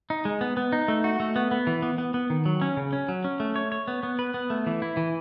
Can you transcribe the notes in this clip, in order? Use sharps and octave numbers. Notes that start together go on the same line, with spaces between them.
D#4
G#3
B3
B3
D#4
A3
F#4
A3
B3
B3
E3
B3
B3
B3
D#3
F#3
C#4
C#3
C#4
F#3
C#4
A3
C#5
C#5
B3
B3
B4
B3
A3
E3
E4
E3